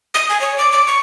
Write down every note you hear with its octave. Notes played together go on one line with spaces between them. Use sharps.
D#6
G#5
C#5
D6
D6
C#6